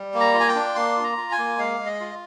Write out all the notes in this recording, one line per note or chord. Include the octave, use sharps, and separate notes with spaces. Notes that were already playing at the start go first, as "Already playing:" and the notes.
Already playing: G3
A#3
A#5
F4
G#5
G5
D4
A#3 C6
F4
A#5
F4
G#5
A#3
G#3 F5
G#3
D#5
F4